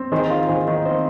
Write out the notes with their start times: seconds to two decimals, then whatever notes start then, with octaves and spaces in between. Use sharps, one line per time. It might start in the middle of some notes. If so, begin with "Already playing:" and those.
Already playing: C4
0.12 D#3 G#4 C5
0.30 F4
0.48 D#3 G#4 C5
0.68 D#3
0.85 C4 C5 D#5